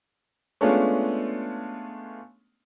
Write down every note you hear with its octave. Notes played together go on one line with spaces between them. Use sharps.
G#3 A3 B3 C#4 D4 F4